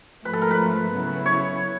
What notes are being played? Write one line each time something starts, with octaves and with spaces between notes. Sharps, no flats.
G#2 F3 A3 B4
A4
A#4
B4
C#3 F#3 B3 E4
C#5